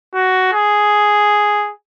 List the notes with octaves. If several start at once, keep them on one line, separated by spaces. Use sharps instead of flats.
F#4
G#4